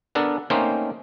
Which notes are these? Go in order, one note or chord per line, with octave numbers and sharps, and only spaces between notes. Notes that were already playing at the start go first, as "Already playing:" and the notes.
B3 D4 A4 A#4
A3 A#3 C4 C#4 D#4 C5